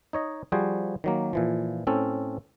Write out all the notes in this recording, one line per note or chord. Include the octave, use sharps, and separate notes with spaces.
D#4 C#5 D#5
F3 G3 F#4 G#4 C5
D#3 F#3 A#3
A#2 E3 F3
A2 C4 C#4 A4